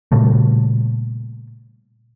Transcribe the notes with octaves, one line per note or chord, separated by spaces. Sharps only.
A#2 C#3 G3 A3